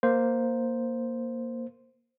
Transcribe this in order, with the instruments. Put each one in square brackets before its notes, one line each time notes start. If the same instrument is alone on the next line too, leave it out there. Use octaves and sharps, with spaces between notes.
[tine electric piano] A#3 C5